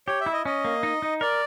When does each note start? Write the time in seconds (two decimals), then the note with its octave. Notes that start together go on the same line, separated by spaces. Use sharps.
0.08 G4 C#5
0.21 E5
0.26 E4
0.33 D#5
0.45 C#4 D#5
0.65 A#3
0.83 D#4
1.02 D#4
1.21 A#4 D5